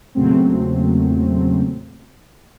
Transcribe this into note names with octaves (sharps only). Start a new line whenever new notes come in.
E2 A#2 C#3 F#3 A3 C4